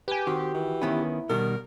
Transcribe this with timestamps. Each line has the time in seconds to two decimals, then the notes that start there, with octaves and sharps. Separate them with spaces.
0.08 G4 B4 G#5
0.27 D#3 C4 F#4
0.54 E3
0.82 D#3 B3 C#4 E4
1.30 B2 D#3 G3 A#4